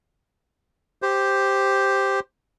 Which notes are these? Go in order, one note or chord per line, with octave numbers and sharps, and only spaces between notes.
G4 C5